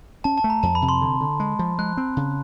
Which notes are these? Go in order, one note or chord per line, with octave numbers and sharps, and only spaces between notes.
C#4 A5
A5
A3
A#5
F2 A5
B5
C3
C6
D3
D3
G#3
F3
G#3 F#6
C4
C#3